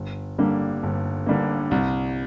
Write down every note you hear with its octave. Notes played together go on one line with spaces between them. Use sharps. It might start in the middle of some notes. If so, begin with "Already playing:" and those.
Already playing: G1
G2 D3 G3 A#3
G1
G2 D3 G3 A#3
C2